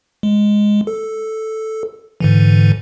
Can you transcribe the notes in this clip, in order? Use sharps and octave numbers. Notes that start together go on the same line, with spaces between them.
G#3
A4
G#2 D3 E3